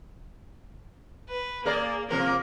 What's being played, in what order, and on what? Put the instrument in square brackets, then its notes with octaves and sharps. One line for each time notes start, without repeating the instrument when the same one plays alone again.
[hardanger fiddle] B4
[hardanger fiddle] A#3 [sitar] G#4 A#4 D5
[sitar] C3 F3 A#3 [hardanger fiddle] A#4